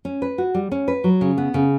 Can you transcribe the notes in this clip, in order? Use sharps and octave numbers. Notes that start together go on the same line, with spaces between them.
C#4
B4
F#4
G3
C#4
B4
F#3
C#3
B3
C#3